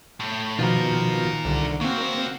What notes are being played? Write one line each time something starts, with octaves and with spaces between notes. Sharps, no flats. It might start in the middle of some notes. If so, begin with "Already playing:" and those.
A2
B2 D#3 F3 F4 A#4
C2 D3
C#3 A#3 C4 F#4